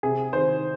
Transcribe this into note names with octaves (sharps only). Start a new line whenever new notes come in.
C3 G#4
D#3 C5